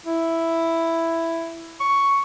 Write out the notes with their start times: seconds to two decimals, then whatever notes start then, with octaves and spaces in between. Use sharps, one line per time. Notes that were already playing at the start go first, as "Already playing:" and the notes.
0.05 E4
1.80 C#6